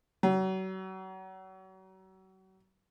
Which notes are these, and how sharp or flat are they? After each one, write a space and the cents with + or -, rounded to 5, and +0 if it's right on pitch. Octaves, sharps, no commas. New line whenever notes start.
F#3 +35